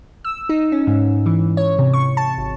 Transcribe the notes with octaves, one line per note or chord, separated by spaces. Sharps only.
E6
D#4
C#4
G#2
E3
C#5
C3
C#6
A5
G#1